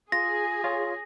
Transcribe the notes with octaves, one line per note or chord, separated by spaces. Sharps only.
F4 G#4 A#6
F4 C#5